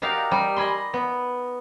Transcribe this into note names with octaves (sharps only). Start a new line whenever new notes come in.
D#4 F#4 G4 A#4 D5 F5
G3
D#5 G#5 B5 C6
B3